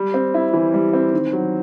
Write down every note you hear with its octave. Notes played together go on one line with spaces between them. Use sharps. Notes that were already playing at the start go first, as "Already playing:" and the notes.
Already playing: G3
C4
E4
E3
G3
C4
D#3
F#3